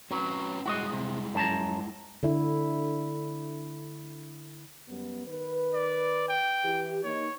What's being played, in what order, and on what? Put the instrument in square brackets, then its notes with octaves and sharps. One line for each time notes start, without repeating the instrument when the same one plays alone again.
[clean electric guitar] F#3 [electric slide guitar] C4 C#4 B4
[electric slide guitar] G3 G#3 E4 [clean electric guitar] F#4 C#5 D#5
[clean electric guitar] C3
F#2 A5 A#5
[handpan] D3 E4
[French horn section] F#2 G3 B3
D#3 B4
[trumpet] D5
G5
[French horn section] E3 G4
[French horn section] A#3 D#4 [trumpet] C#5